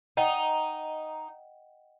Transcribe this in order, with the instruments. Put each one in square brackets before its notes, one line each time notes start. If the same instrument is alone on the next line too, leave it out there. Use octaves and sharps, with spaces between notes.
[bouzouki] D#4 [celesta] D#5 F#5 G5